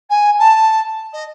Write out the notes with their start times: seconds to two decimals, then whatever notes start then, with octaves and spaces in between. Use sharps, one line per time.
0.10 G#5
0.39 A5
1.13 D#5